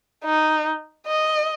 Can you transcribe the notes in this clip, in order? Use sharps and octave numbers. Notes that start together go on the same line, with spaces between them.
D#4
D#5